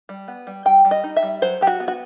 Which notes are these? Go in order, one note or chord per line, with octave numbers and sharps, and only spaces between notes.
G3
B3
G3
G3 G5
G3
D#5
D#4
E5
G3
F#3 C5
F#3 G4
F#4
B3
F#4